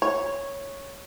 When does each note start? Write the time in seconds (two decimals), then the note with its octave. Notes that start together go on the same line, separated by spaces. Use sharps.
0.02 C#5